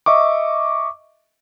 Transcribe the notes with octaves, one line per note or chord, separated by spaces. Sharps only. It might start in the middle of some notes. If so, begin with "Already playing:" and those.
D#5 E5 C#6 D6